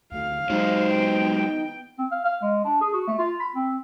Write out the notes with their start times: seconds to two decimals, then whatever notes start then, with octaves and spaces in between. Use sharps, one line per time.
0.12 D2 F5
0.50 F#3 G#3 D#4 C5
0.89 B3 G5
1.98 C4
2.11 F5
2.24 F5
2.42 G#3
2.64 D4
2.81 G#4
2.93 F#4
3.07 A3
3.19 F4
3.40 B5
3.55 C4